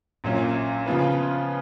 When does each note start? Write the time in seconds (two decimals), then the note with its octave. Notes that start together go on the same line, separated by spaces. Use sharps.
0.24 A#1 A#2 F#3 C#4 F4
0.86 C#3 F3 B3 F4 B4